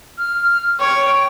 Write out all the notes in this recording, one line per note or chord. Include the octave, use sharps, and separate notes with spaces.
F6
C#5 G5